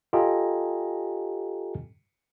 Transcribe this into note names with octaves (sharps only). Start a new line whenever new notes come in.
F4 G4 A4 D#5 G#5 A#5